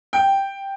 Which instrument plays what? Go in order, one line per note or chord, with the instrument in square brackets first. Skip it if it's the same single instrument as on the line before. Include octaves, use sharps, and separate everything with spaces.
[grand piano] G5